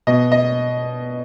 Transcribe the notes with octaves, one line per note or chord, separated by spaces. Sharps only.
B2 D#5
D#5